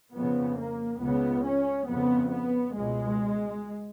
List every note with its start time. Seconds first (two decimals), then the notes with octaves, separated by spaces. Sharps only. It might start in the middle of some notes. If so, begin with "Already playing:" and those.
0.15 F2 C#3 B3
0.58 A#3
1.02 C#2 C#3 B3
1.46 C#4
1.89 F2 C#3 B3
2.33 B3
2.76 C#2 B2 G#3